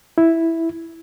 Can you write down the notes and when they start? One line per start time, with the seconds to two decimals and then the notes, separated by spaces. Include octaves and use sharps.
0.18 E4